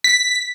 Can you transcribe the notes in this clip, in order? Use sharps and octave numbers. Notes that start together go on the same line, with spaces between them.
B6